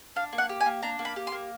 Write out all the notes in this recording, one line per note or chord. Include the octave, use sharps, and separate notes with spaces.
D4 F5
A#3
F#5
G4
G#5
A#3
D4 A#5
A#3
B5
G4
C6
A#3